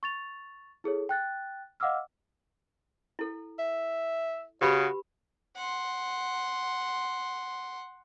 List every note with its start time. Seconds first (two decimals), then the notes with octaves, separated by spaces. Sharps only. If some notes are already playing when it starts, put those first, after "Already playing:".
0.03 C#6 A6 F7
0.84 E4 G#4 A4 C#5
1.09 G5 F#6 A6
1.80 D#5 F5 F#5 D6 E6 F6
3.19 E4 A4
3.59 E5
4.61 C#3 F#4 G4 B4 B5
5.56 F#5 C6